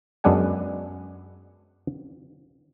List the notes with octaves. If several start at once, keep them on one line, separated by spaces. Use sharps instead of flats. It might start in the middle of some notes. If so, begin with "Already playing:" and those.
F#2 G#3 B3 D4 F#5 G#5